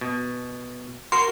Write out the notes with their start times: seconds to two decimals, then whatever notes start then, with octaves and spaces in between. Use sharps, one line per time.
0.01 B2
1.12 F#4 A#4 C6